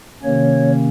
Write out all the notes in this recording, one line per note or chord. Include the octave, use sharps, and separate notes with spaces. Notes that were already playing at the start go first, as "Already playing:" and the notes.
C3 D#3 A#3 C#4 C#5